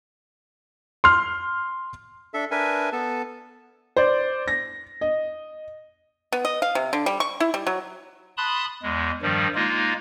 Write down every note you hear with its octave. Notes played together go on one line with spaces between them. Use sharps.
C6 F6
D4 A4 E5
D4 A#4 B4 E5 G#5
B3 A4 A5
C5 D5
A#6
D#5
B3
D#5
F5
C3
D3
G3
C#6
E4
G3
F#3
A5 B5 C6 D#6 F#6
E2 G#3
G2 D#3 F3 G3
G#3 A#3 D#4 F4